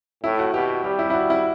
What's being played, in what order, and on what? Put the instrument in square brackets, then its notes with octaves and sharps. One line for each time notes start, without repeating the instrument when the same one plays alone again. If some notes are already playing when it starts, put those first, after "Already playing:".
[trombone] A2 [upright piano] E4
[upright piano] F#4
[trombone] B2 [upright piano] G4
[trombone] G3 [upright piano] G4
[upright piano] E4
E4
F#4
E4